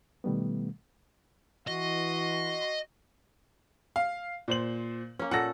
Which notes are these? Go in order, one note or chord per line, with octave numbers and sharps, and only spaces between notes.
B2 D#3 G3 A3 B3
E3 F#4 D#5 C6
F5
A#2 C5 F#7
A#3 C#4
A#2 A4 F#5 A#6